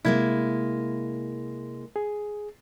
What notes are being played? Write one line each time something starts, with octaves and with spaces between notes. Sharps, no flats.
C3 G#3 A#3 E4 G#6
G#4